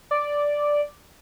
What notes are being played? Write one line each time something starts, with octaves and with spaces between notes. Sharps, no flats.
D5